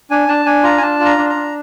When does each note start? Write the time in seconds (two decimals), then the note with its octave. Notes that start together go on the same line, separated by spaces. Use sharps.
0.11 D4 G#5
0.28 D4 A5
0.45 D4 G#5
0.63 F4 A#5
0.78 G#5
0.82 D4 A5
1.00 F4
1.05 A#5
1.18 D4
1.30 A#5
1.35 D4